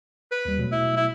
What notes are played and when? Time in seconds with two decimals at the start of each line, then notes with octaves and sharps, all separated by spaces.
0.32 B4
0.45 D#2 G3
0.58 B2 F#3 A3
0.72 E4
0.97 E4